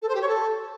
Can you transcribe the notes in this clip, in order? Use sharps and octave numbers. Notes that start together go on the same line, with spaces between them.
A4
C5
G4
C#5
A4